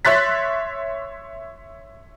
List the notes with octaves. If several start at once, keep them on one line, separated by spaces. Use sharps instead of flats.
C#5 E5 C6 F#6 A6 B6